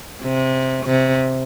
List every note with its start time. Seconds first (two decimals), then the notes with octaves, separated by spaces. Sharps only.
0.23 C3
0.86 C3